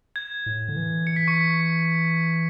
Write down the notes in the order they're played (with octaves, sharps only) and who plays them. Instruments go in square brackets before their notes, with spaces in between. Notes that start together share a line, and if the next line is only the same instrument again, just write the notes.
[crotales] G#6
[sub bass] A2
D3
E3
[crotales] C#7
B6
C#6 C#7